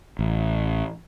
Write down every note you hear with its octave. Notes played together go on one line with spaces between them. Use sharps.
A1